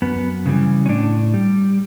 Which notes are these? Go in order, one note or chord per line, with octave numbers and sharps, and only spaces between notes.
F#2 B3
C#3 E3 G3
C#4
A2 D4
G3